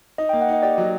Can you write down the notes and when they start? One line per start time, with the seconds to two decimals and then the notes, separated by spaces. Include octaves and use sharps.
0.18 D#4 D#5
0.29 G5
0.33 A#3
0.41 F#5
0.48 D#4 D#5
0.63 G4 D5
0.78 F#3